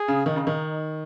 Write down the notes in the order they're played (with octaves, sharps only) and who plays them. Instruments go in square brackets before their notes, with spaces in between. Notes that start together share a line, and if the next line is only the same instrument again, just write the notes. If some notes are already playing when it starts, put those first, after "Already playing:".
Already playing: [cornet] G#4
[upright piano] C#3
[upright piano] D#3 [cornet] D#4
[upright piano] C#3
D#3